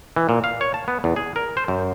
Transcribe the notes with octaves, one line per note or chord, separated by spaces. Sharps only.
E3
A#2
F5
C#5
A5
B3
E2
G#4
A#4
C5
F#2